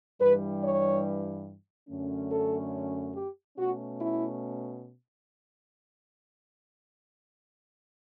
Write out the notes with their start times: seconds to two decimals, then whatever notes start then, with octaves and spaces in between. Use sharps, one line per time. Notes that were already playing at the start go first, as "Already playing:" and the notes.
0.21 G2 E3 G3 B4
0.63 C#5
1.89 F#2 D3 A3 C#4
2.32 A4
3.16 G4
3.57 B2 A3 C#4 F#4
4.00 E4